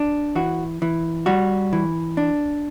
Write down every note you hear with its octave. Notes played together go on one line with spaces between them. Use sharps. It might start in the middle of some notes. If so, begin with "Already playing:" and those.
Already playing: D4
E3 F#4
E3
G3 F#4
E3
D4